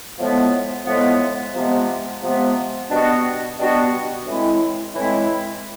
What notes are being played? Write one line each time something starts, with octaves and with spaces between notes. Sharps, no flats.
A2 F3 G#3 B3
A2 F3 G#3 B3
C3 F3 G#3 B3
C3 F3 G#3 B3
B2 G3 B3 D4 F#4
B2 G3 B3 D4 F#4
A2 E3 G#3 C4 E4
A2 E3 G#3 C4 E4